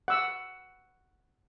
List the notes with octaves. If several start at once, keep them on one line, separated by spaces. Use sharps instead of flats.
F#5 E6